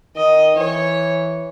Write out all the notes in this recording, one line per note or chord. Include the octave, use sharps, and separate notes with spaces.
D#3 D#5
E3 C#5